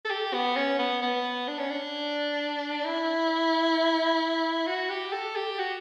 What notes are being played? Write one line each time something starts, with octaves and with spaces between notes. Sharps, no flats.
A4
G4
B3
C#4
B3
B3
D4
C#4
D4
E4
F#4
G4
A4
G4
F#4